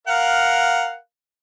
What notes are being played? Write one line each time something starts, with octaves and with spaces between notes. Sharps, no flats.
A#4 F5 F#5